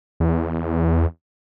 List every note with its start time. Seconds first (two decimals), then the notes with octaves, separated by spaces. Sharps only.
0.20 E2